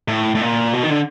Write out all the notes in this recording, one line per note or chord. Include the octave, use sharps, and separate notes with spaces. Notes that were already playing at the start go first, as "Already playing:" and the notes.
A2
A2
A#2
B2
D#3
D3